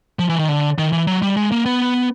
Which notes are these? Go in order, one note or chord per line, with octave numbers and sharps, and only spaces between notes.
F3
E3
D#3
D3
D#3
E3
F#3
G3
G#3
A#3
B3